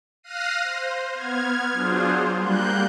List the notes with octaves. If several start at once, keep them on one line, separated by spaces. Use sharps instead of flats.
F5 F6 F#6 A#6 C7 D#7
C5
B3 F6 G#6
F#3 D4 F4 G#4 C5
G3 A#3 F#6 G6